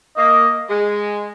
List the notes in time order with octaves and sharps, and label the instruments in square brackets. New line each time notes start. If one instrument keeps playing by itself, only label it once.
[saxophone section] A#3 [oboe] D#5
[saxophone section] G#3